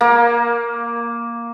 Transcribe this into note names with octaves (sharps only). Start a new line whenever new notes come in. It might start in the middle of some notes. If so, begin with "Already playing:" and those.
A#3